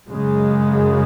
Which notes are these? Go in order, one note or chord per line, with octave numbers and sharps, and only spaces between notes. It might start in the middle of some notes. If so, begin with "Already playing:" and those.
F#2 C#3 G#3